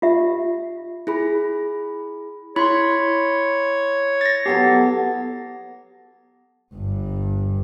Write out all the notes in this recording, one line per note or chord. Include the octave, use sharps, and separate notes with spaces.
F4 G4 E5
E4 G#4 B5
E4 C#5 B5 C6
A6 A#6
F#3 B3 G4 A4
G1 G2